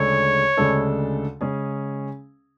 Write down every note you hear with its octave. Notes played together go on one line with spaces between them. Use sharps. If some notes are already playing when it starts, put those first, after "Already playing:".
Already playing: D2 C#3 G#3 D4 A4 C#5
D2 C#3 G#3 D4 A4
C#3 G#3 C#4 G#4